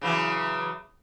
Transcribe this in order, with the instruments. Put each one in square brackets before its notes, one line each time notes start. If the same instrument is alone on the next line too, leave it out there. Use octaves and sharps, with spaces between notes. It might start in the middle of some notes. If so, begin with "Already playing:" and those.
[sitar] C#3 E3 F#3